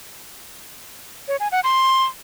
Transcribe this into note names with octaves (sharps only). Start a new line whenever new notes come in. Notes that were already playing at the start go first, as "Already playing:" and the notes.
C#5
G#5
F#5
C6